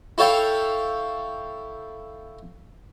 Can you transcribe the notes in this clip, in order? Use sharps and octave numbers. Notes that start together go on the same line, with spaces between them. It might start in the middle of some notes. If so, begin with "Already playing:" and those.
E4 A4 C#5 F5 G5